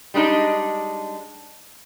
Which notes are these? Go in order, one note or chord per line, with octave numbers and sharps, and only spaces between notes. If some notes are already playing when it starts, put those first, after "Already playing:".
G3 G#3 D4 D#4